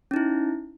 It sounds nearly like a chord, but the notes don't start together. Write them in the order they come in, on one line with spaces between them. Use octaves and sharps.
C#4 D#4 E4